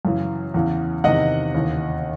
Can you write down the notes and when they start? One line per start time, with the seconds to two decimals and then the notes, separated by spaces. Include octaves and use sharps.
0.05 F#2 C#3 E3
0.54 E2 C#3 E3
1.04 E2 C3 D#3 D#5 F#5
1.54 D#2 C#3 E3